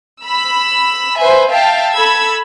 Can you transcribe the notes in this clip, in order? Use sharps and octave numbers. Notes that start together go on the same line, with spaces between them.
B5 E6
B4 C5 E5 G#5
E5 F5 G5 A5
A4 B5 E6 G#6